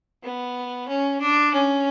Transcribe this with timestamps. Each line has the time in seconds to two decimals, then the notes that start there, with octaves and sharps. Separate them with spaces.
0.23 B3
0.88 C#4
1.21 D4
1.54 C#4